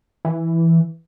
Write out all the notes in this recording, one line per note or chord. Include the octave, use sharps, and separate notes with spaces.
E3